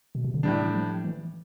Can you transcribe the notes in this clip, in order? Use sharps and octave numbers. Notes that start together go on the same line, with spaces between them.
B2
C3
D3
A2 E3 G3 D4
F3
E3